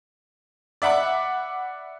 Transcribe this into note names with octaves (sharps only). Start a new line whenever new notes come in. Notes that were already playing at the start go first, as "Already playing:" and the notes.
D5 E5 F#5 B5 D6